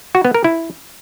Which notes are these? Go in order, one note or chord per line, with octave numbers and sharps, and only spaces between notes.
F#4
B3
A#4
E4